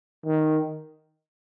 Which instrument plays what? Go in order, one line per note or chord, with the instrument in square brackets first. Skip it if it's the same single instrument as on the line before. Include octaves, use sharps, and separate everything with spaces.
[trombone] D#3